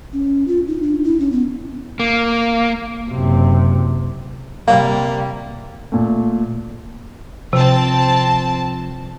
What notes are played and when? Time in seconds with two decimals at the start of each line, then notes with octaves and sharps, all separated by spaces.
0.13 C#4
0.48 F4
0.67 D#4
0.82 D4
1.04 E4
1.20 C#4
1.32 B3
2.00 A#3
3.11 F#1 C3
4.68 C3 G3 A#3 F5
5.92 A#2 A3
7.53 C3 F3 C4 A5